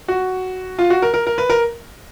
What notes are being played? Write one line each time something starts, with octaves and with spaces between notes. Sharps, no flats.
F#4
F4
F#4
A#4
A#4
A#4
B4
A#4